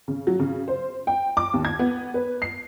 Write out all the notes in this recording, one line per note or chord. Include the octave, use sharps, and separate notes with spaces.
C#3
F#3
C#3
C5
G5
D6
D#2
G#6
B3
B4
C7